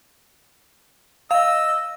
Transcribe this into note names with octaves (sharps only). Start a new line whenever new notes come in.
D#5 F5 E6